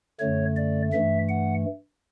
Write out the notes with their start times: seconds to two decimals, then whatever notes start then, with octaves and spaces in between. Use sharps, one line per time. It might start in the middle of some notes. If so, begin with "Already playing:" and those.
0.20 F#2 D3 A3 C#5
0.57 D5
0.92 G2 E3 A3 E5
1.29 F#5